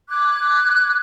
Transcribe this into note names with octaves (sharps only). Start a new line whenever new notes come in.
D6 F#6 G#6